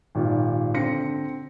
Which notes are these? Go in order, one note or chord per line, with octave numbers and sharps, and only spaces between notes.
G#1 A#2 G4
D3 C4 A#6 C#7